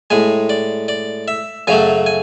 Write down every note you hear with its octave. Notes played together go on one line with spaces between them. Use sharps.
A2 G#3 G#5
D5
D5
E5
F#2 C#3 F#3 A3 G#5
G#5